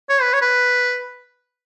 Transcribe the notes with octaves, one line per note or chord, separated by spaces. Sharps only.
C#5
B4
C#5
B4